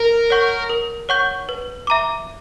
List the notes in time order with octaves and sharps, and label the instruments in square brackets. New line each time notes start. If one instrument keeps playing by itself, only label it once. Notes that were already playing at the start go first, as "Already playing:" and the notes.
Already playing: [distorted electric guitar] A#4
[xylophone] C#5 F#5 C#6 G6
A#4
C#5 F#5 C#6 G6
B4
E5 A#5 D6